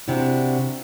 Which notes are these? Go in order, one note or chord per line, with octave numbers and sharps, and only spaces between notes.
C3 D4 E4 F#4